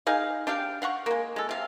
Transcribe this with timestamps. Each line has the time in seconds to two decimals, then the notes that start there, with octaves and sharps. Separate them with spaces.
0.07 D#4 G#4 F5
0.47 D4 G4 F5 G5
0.82 F5 F#5 A#5 C#6
1.06 G#3 A#3
1.36 G#3 A4
1.49 C3 F5